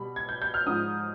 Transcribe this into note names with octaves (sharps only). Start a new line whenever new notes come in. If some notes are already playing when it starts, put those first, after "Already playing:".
Already playing: B2 G3 B5
G#6
G6
G6
F6
G#2 F3 D#6